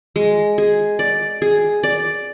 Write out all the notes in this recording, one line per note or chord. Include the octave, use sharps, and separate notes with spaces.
G#3
G#4
D5
G#4
D5